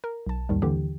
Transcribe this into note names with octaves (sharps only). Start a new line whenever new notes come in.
A#4
B1 A5
D#2 G#2 D#3 G3
D#2 D3 E3 G4